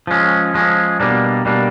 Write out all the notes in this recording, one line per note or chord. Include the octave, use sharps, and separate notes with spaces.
F3 G#3 C#4
F3 G#3 C#4
B2 G3 A#3 D4
B2 G3 A#3 D4